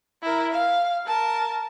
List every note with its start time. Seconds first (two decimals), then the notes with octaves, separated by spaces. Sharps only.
0.23 E4 A#4
0.52 F5
1.06 A#4 A5